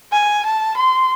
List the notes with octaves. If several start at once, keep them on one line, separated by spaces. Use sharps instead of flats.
G#5
A5
C6